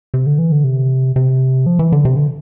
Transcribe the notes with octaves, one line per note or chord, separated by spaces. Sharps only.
C3
D3
E3
D3
C3
C3
F3
E3
D3
C3
D3